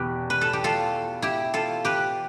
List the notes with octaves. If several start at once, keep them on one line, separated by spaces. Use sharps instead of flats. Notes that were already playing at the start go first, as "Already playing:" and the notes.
Already playing: E2 B2 G4 B4
B4
A4
G4
F4 A4
E4 G4
F4 A4
G4 B4